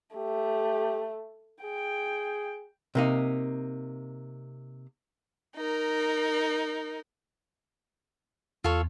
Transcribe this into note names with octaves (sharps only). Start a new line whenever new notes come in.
A3 G4
G#4 G5
C3 A#3 D#4
D#4 A#4
E2 F4 A4 C#5